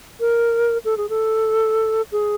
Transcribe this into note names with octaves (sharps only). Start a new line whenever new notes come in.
A#4
A4
G#4
A4
G#4